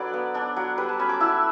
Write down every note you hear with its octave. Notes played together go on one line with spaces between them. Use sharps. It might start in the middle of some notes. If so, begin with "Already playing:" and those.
Already playing: F#3 D4 A4 B4 D5
B3
D4 D5
F#3
G3 B4
A5
C#4 B5
D6
E4 E6